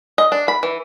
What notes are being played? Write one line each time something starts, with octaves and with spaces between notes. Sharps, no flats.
D#5
D4
B5
E3